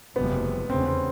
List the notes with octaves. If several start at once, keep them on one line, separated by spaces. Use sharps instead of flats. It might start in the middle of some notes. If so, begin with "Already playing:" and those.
F#1 E2 C3 F3 G#3 B3
F1 E2 C#3 C4
C#4
C4